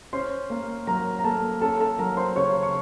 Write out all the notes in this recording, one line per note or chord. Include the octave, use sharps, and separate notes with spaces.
C#4 C5 C6
A#3
F#3 A#4 A#5
A#5
A#3 A4 A5
C#4 A4 A5
A4 A5
F#3 A#4 A#5
C5 C6
C#3 C#5 C#6
C#6